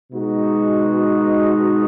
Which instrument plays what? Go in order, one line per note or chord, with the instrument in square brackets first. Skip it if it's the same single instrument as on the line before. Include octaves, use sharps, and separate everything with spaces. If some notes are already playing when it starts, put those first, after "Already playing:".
[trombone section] B2 G#3 D#4 F#4